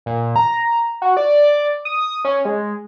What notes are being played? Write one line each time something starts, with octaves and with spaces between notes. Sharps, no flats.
A#2
A#5
F#4
D5
D#6
C#4
G#3